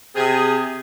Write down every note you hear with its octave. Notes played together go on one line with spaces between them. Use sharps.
C3 G#4